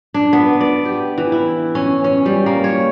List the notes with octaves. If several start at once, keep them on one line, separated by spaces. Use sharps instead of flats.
D4
B3
D5
G4
E3
E4
C#4
C#4
G3
A#3
C#5